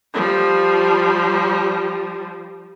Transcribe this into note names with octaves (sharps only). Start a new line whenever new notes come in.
F3 G3